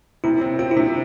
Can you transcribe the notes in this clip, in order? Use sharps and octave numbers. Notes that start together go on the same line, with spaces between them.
C3 E4
C4
C4 F4
E4
C3 D4